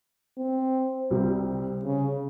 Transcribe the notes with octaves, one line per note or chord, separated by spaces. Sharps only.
C4
C2 C3 G3 C4 G4
C#3